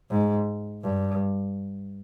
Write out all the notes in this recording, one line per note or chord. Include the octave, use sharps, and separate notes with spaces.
G#2
G2